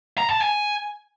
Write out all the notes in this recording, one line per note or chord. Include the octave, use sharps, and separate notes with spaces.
A#5
A5
G#5